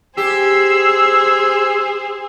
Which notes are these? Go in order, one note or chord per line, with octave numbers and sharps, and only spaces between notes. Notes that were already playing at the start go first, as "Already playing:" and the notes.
G4 G#4 C5 E6 C7